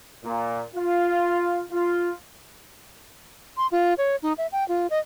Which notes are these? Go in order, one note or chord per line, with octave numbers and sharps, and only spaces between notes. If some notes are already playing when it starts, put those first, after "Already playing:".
A#2
F4
F4
C6
F4
C#5
D#4
E5
G5
F4
D#5